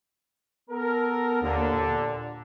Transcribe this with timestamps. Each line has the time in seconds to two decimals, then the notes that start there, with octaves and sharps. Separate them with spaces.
0.70 B3 A4 A#4
1.42 D#2 D3
1.72 A#2